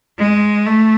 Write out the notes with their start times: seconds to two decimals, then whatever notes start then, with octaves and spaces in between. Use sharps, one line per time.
0.18 G#3
0.66 A3